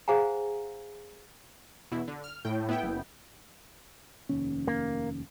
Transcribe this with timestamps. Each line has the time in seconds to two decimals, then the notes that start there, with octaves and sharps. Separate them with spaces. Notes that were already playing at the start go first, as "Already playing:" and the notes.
0.08 G#4 C5 F5 F#5 G#5 A#5
1.91 E2 B2 E4
2.08 D3
2.24 F6
2.45 A2 G5
2.69 B3 E4 G5
2.83 F#1
4.29 F1 D#2 C#4
4.67 A#3